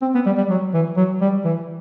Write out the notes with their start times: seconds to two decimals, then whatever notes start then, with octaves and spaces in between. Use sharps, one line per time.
0.02 C4
0.15 B3
0.26 G3
0.37 G3
0.50 F#3
0.74 E3
0.97 F#3
1.21 G3
1.45 E3